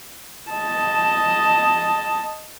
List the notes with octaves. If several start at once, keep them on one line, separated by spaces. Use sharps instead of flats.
D#5 A5